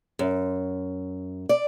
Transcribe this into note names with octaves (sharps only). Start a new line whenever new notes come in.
F#2
D5